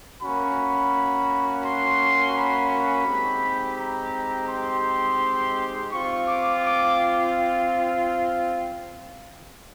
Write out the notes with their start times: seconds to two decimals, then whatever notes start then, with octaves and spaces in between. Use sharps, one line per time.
0.22 A#3 C#4 F#4 B5
1.64 C6
2.35 B5
3.07 G#3 C4 D#4 G4
3.78 A#5
4.49 C6
5.91 C4 F4 C#6
6.27 D6
6.63 D6